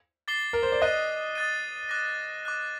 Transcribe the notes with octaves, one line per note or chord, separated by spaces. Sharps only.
D6 A6 C7 G7
A#4
C5
D5
D#5 D#6 F#6 A6 D#7
D#6 F#6 A6 D#7
D6 F#6 A#6
D6 F#6 A#6